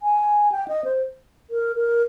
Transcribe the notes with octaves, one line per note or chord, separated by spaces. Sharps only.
G#5
G5
D#5
C5
A#4
A#4